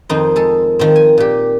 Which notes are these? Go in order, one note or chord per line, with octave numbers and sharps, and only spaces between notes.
F2 D#3 C4 D#4 C5
G#3 A4
D#3 F3 C4
G#5
A#2 G4